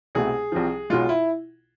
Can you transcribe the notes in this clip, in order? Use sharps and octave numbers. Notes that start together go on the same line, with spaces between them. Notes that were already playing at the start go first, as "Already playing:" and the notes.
C2 B2 A3 C4 G#4
C2 C3 F3
B1 B2 G#3 F4
E4